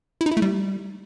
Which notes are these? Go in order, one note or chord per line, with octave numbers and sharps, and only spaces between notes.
E4
D#4
E4
A3
G3